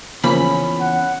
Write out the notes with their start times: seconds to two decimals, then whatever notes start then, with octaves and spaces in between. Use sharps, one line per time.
0.24 E2 C#3 F3 A#3 C#4 B5
0.81 F#5